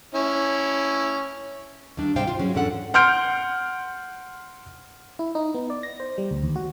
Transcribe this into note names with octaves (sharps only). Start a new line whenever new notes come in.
C#4 E4
D#2 G3 D4
G#2 C3 G3 C5 F5 G5
F4
F#3 G#3 C#4
E2 G#2 C#4 D4 A4 F#5
F#5 C6 F6 G6 D7
E4
D#4
B3
D5
A#6
C5
G3
D2
D#2
F#4